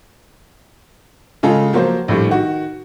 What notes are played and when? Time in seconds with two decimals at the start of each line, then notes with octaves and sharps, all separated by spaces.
1.43 C#3 G#3 F4 G#4 A4
1.73 F3 F#3 A#3 F4 C5
2.08 A#1 A2 G3
2.29 D#3 F#4